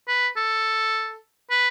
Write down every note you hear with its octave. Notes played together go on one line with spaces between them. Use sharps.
B4
A4
B4